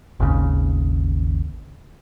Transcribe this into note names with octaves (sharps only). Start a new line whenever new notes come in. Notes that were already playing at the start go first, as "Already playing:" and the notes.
G#1 D#2 C#3